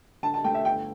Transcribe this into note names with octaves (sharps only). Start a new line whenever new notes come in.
D3 A5
A5
A3 G5
E5
G1 G5